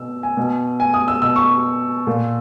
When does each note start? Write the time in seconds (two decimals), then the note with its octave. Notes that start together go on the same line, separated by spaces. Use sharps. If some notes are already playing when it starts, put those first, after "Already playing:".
Already playing: B2 E6
0.23 G#5
0.37 B2
0.80 G#5
0.94 D#6
1.08 E6
1.22 B2 E6
1.36 C#6
2.07 A#2